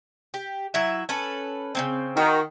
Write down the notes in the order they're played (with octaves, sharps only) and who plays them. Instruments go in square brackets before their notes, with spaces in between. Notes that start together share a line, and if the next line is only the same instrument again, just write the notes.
[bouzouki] G4
F#3 E4 E5
C#4 A4 B4
C#3 A#3 C4
[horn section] D#3 [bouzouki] F#4